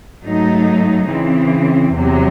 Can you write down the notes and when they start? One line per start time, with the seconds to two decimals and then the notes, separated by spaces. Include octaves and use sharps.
0.24 G#2 F#3 A3 D#4
1.10 C#3 E3 C4
1.96 E2 C3 F#3